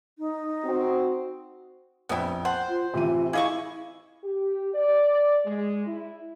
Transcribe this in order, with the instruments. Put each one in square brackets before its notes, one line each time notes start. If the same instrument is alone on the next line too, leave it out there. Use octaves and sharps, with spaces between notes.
[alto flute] D#4
[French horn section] C4 F#4
[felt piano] A#1 F2 G5 [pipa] B3 E4
[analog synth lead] C5 [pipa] F#5 [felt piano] A5
[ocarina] F4
[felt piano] A1 E3 D#7 [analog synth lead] C3 [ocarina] F4
[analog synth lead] E4 [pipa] G#4 D#5 C#6 [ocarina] F5 [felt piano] D6
[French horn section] G4
D5
G#3
E4